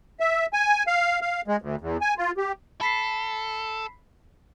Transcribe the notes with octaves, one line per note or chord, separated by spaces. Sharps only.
E5
G#5
F5
F5
G#3
D2
E2
G#5
F4
G4
A4 B5 B6 C7